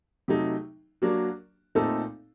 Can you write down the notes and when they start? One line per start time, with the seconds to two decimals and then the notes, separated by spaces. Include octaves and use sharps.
0.28 C3 F#3 A3 D#4
1.02 F#3 A#3 D4 F#4
1.75 A#2 A3 C4 D#4 A4